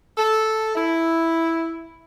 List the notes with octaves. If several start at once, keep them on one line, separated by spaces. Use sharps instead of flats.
A4
E4